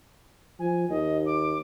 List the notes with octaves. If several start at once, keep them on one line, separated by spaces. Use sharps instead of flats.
F3 G#5
D#2 D#5
D6